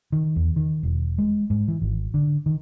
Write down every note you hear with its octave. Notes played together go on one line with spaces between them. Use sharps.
D#3
E2
D#3
E1
G#3
G#2
E3
G#1
D3
D#3